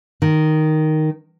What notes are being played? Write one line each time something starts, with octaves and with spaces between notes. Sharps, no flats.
D#3